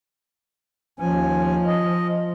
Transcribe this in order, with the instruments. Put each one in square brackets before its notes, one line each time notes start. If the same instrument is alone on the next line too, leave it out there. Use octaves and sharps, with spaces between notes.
[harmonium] D#2 C#4 G#5 [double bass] F3
[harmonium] D#5